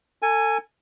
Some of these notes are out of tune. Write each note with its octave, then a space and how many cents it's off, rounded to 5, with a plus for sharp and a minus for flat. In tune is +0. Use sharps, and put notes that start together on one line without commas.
A4 +30 G#5 +0